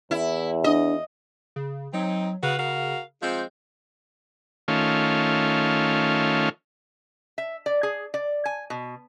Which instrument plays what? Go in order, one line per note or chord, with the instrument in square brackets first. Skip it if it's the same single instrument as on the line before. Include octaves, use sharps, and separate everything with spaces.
[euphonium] E2 [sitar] E4
[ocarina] D4 [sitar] D#5
[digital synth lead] C#3
[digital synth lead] F#3 [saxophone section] C4 D#4
[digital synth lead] C#3 [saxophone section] F#4 B4 F5
[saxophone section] F#4 A#4 F5
[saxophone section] F3 G#3 C4 [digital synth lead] G6
[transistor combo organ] D#3 A3 C#4 F4
[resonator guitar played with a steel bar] E5
D5
G#4
D5
G#5
B2